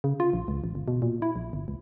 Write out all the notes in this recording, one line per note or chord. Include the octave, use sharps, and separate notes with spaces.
C#3
F4
A#1
C#2
A1
G1
B2
A#2
E4
A#1
G1
C#2